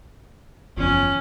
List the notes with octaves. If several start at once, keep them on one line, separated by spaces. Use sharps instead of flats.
F#1 E2 F3 C#4